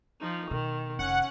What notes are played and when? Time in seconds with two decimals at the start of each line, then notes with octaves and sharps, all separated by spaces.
0.21 F3 D#4
0.51 B2 D#3
0.99 F1 C#4 F#5